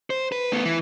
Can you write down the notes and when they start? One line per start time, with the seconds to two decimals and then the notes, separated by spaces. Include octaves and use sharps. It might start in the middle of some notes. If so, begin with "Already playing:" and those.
0.10 C5
0.32 B4
0.52 A3 B3
0.65 E3